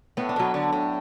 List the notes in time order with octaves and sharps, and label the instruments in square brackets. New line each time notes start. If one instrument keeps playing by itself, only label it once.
[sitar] A2 [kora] B3
[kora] D4
[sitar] B2 [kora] F#3 B3
[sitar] D3
A2